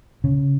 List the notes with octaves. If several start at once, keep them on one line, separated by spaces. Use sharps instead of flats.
C#3